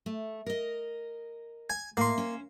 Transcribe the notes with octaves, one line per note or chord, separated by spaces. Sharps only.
A3
A#4 D#5
G#5
A2 A#3 C6
C#4 C5